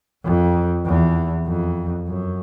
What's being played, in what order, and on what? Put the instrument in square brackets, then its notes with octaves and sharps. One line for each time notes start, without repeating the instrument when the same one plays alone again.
[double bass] F2
E2
F2
F#2